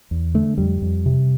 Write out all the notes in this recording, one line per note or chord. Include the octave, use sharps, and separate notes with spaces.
E2
D3 A3
F2 G3
F2
C3